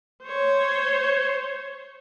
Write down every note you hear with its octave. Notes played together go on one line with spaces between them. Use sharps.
C5 C#5